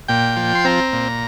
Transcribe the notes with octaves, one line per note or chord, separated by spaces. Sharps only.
A#2 G5
F3
C6
C4 A#5
A#2